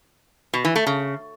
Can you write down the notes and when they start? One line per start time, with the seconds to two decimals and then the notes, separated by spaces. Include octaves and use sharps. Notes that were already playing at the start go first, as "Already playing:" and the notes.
0.54 B2
0.65 E3
0.76 A3
0.87 C#3